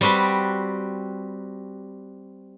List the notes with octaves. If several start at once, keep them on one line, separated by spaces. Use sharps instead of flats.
G3 C4 F#4 B4 A5